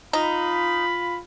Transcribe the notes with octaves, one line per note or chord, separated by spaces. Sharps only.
D#4 F4 B5